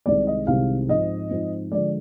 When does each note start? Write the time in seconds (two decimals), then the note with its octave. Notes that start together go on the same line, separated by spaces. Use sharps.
0.06 C2 C3 D#3 G#3 C4 D5
0.27 D#5
0.47 C2 C3 D#3 G#3 C4 F5
0.89 G#2 F3 C4 D#5
1.31 G#2 F3 C4
1.72 D3 F3 G#3 D5